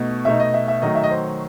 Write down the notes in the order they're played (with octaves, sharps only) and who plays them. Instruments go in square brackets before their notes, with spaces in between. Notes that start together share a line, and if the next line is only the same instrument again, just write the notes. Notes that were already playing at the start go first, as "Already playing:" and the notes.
Already playing: [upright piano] B2 A3 D#4
[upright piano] B2 A3 D#4 [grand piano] E5
[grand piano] D#5
E5
E5
[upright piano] D#3 F#3 A3 [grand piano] D#5
[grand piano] E5
D#5
C5